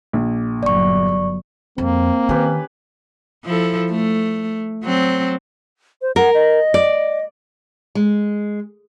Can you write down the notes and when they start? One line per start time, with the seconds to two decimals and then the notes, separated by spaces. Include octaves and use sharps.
0.13 A#1
0.63 G1 F#3 D5 C#6
1.78 F2 A#3 C4
2.29 D#3 C#4 G4 B4
3.45 F3 E4 A4
3.91 A3
4.84 F#3 C4
6.02 C5
6.16 A#4 F#5
6.34 D#5
6.74 D5
7.95 G#3